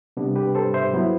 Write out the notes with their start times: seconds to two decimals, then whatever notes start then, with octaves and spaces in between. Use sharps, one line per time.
0.17 C3 G3 B3 D4
0.36 G4 B4
0.55 A4 C5
0.74 C5 E5
0.93 F#3 B3 E4